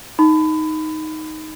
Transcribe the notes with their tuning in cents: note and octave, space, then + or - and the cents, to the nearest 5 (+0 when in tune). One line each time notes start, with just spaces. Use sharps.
D#4 +5 B5 +25